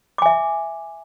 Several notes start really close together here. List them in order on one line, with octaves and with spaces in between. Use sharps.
D6 G#5 E5